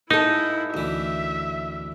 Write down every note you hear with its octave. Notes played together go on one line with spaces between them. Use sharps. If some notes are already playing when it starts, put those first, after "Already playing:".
G#2 A#3 D#4 E4 A4
D2 E3 E5